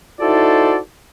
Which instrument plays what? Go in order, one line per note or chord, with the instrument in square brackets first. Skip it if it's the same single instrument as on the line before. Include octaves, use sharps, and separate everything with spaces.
[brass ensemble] D#4 E4 F#4 A4 C5 D5